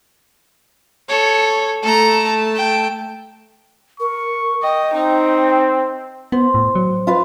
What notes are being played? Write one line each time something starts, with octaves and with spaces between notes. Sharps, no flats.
A4 C#5
A3 A4 A5 A#5
G5
A#4 C#6
D#5 G5
C4 D#4
B3 C5
A2
F#3
F4 B4 F5